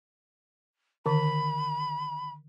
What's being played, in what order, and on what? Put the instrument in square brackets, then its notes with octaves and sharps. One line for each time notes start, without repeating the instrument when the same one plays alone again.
[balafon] D3 D#3 [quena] B5